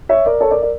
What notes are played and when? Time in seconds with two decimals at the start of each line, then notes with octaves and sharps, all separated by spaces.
0.09 C#5 E5
0.26 A#4 D5
0.40 A4 C#5
0.51 A#4 D5
0.62 A#4 D5